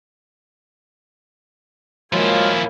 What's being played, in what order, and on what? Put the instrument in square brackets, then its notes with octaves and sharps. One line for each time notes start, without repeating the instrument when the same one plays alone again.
[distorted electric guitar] F3 E4 [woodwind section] F#3 G#3 F4 [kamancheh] A#3 G#5